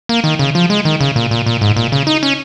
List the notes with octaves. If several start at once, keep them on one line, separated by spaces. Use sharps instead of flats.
A#3
D#3
C#3
F3
G#3
D#3
C#3
A#2
A#2
A#2
G#2
A#2
C#3
D#4
C#4